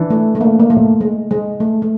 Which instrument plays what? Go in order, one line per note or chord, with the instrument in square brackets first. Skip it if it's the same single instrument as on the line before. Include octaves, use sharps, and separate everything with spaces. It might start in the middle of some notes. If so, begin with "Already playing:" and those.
Already playing: [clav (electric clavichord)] E3 D4
[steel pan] A3
A3
A#3
A#3
A3
G#3
G#3
A3
A3